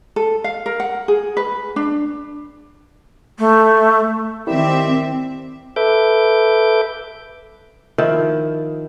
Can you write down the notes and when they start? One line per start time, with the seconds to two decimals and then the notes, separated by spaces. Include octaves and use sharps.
0.16 A4
0.44 F5
0.66 A#4
0.80 F#5
1.08 G#4
1.37 B4
1.76 D4
3.39 A3
4.47 D#3 C4 E4 G4 A#4 D5 E5
5.76 A4 B4 E5 D6 G6
7.98 D#3 F3 E4